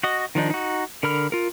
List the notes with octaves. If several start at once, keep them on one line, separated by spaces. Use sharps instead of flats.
F#4 D#5
D#3 F3 D4 D#4
D#4 F#4
D3 A#4 B5 F6
F4 A#4